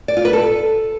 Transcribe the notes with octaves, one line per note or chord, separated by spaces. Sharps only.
D5
F4
B4
A4